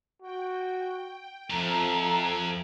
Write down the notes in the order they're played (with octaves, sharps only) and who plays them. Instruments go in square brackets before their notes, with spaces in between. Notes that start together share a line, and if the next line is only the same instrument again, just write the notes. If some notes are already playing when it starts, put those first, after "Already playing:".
[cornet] F#4 [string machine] G5
[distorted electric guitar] F2 [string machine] F3 E5 G#6 [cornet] A4 [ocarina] A#5